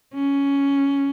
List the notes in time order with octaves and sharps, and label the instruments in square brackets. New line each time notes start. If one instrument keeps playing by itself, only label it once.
[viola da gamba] C#4